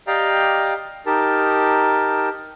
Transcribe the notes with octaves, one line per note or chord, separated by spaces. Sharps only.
G4 D5 D#5 F5 G5 A#5
D#4 G4 A#4 A5